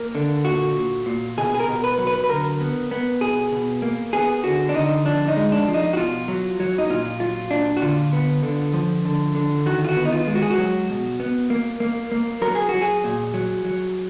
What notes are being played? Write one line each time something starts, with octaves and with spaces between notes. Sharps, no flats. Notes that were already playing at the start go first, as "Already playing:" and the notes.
Already playing: A#3
D3
A#2 F#4
A#2
A#2
B2 G#4
G#4
A#4
B2
B4
F#3
B4
B4
D3 A#4
B3
B3
B2 G#4
B2
A#3
B3 G#4
D3 F#4
D4
D3 D#4
F3 D4
D#4
G#3
D4
F3
D#4
F#4
B2 F4
F#3
F#3
D#4
A#2 F4
F#3 F4
A#2 D4
F#4
D3 F4
B3
D3
F3
D3
D3
D#3 F#4
F4
F#4
B3
D#4
F4
G#3
F#4
G#4
F#4
F#3
B2
B3
A#3
A#3
A#3
F#3 A#4
G#4
F#3 F#4
G#4
A#2
F#3
F#3